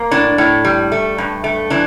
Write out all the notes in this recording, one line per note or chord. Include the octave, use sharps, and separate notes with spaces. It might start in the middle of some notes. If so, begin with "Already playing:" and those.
Already playing: A#3
A2 D4
A2
G3
A3
G2
A3
E3 D4